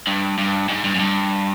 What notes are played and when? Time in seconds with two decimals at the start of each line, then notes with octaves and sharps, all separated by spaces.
0.07 G2
0.38 G2
0.69 G#2
0.85 G2
0.95 F#2
1.00 G2